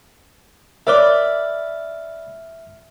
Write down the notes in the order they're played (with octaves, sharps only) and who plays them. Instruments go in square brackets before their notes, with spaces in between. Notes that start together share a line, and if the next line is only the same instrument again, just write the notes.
[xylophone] A#4 C#5 D6 [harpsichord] D5 B5 [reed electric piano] E5 F6